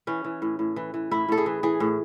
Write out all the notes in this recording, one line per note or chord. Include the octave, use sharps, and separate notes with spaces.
E3 C#4
E3
A2
A2
E3
E3
A2 E4
A2 A4
G#4
E3
E3 G#4
A2